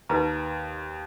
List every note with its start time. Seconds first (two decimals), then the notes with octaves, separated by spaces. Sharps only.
0.10 D#2 D#4 B4 A#5